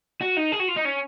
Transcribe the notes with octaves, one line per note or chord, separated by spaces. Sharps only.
F#4
D#4
G#4
F#4
F4
D#4
C#4